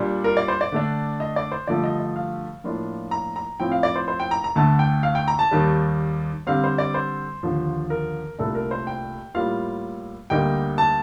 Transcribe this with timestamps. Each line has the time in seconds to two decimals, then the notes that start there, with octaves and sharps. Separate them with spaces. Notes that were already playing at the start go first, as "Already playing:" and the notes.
Already playing: A#2 G3 D4
0.24 A#4
0.37 D5
0.48 C5
0.61 D5
0.72 D3 A3 D4
1.20 D#5
1.36 D5
1.52 C5
1.67 G2 D3 F3 A3 D5
1.84 D#5
2.00 D#5
2.16 F5
2.64 A2 F3 A#3 D4 F4
3.11 A#5
3.36 A#5
3.60 A2 F3 C4 G5
3.72 F5
3.83 D5
3.96 C5
4.08 C5
4.20 G5
4.31 A#5
4.44 A#5
4.56 D2 D3 A3 A5
4.79 G5
5.03 F5
5.15 G5
5.28 A#5
5.39 A5
5.51 D#2 D#3 G3
6.47 D3 G3 C4 F5
6.64 C5
6.78 D5
6.94 C5
7.43 D#2 D3 F3
7.90 A#4
8.39 C2 A#2 A3 D4 A4
8.55 A#4
8.71 C5
8.87 G5
9.35 A2 G3 A#3 F4 F5
10.30 D2 D3 G3 A#3 D#4 G5
10.78 A5